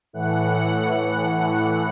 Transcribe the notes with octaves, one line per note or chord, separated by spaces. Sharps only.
A2 E3 F#5